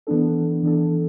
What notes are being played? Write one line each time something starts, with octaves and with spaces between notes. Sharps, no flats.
E3 B3 D4 A4
E3 B3 D4 A4